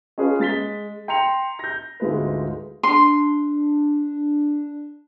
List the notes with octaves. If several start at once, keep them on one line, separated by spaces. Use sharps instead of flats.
C#4 F4 G#4 B4
G#3 A6 B6 G7
G5 A#5 C6 C#7 F7
G6 A#6
D2 G#2 G#3 F4 B4
D4 C6